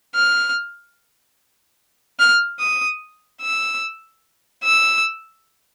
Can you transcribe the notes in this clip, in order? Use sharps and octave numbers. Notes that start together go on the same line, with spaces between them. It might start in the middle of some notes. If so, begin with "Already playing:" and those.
F6
F6
D#6
E6
E6